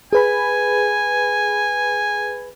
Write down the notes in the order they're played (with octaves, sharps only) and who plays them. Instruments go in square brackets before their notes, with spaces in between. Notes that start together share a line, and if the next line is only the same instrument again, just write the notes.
[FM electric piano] G#4 B4 B5 [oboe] G#5